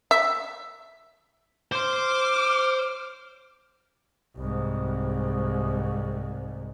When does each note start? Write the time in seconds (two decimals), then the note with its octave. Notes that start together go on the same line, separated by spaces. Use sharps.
0.11 E5
1.72 C5 C6 D6 F6
4.37 C2 G#2